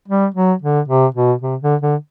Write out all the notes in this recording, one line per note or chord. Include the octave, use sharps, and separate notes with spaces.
G3
F#3
D3
C3
B2
C3
D3
D3